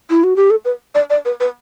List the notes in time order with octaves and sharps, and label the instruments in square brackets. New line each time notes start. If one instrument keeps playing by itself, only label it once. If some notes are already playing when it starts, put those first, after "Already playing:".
[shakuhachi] E4
F#4
G4
A4
B4
D5
D5
B4
B4